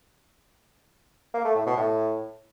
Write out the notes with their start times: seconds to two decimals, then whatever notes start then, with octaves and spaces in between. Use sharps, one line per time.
1.34 A#3
1.45 A3
1.55 A2
1.66 B2
1.77 A2